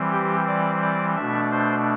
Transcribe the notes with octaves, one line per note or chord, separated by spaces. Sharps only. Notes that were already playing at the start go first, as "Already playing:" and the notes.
Already playing: E3 G3 C4
G4
D5
D5
B2 A3 D4 E5
C5